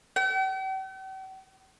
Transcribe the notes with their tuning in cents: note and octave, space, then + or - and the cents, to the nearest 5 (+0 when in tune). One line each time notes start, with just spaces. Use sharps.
G5 -45